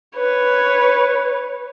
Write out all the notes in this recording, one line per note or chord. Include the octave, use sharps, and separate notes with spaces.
B4 C#5